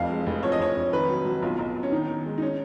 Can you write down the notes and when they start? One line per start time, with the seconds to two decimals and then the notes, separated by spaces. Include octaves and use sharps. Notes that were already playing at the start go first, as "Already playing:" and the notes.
Already playing: F1 F2 F5
0.10 G#3
0.26 F1
0.43 F3 C#5
0.52 D#5
0.59 F1 C#5
0.76 F1
0.92 D#3 B4
1.09 F#3
1.25 F#3
1.42 B1 F4
1.59 B1
1.76 B1
1.83 C#4
1.92 D#3 D#4
2.08 D#3
2.26 G#3
2.38 D#4
2.42 C#4